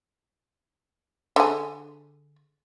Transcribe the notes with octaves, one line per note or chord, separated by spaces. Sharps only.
D3 G#4